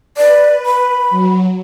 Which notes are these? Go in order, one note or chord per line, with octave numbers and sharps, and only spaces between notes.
B4 D5
B5
F#3